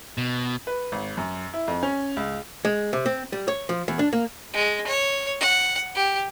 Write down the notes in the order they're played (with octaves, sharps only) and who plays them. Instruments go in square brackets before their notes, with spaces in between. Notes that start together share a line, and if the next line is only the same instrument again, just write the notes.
[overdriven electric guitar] B2
[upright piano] B4
G#1
F#2
E4
F2
C#4
C#2
[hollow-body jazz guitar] G#3
C3
C4
G3
C#5
F3
E2
D4
A#3
[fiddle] G#3
C#5
F#5
G4